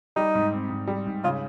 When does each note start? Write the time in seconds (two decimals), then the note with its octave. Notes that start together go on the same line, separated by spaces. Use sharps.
0.16 G3 D#4
0.35 G#2
0.52 C4
0.70 G#2
0.87 G3
1.06 G#2
1.24 C#3 F4